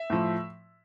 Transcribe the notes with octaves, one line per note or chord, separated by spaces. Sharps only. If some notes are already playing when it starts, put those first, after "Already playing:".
Already playing: E5
A2 F3